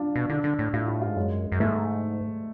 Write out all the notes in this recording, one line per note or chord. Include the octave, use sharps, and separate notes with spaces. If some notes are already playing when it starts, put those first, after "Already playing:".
Already playing: D4 F4
B2
D3 D4
D3
A2
A2 F4
F4
G#2 F4
F#2 G#3
F#2
G#2 A3